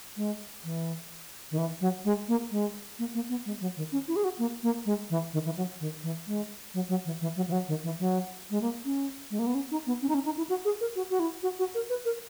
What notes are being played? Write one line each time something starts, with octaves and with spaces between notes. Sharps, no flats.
G#3
E3
D#3
E3
F#3
G#3
A#3
G#3
A#3
A#3
B3
G#3
F#3
D#3
C#4
E4
G#4
F#4
A#3
A#3
G#3
E3
D#3
E3
F#3
D#3
E3
G#3
F#3
F#3
E3
E3
F#3
E3
F#3
D#3
E3
F#3
G#3
A#3
C#4
G#3
A#3
B3
C#4
D#4
B3
C#4
D#4
C#4
D#4
E4
F#4
G#4
A#4
F#4
F#4
E4
F#4
F#4
A#4
B4
A#4